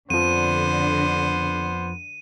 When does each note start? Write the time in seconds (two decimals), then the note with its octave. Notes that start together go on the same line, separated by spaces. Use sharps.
0.10 F2 D3 F3 B3 C5 D#7